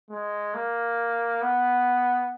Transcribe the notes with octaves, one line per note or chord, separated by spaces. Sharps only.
G#3
A#3
B3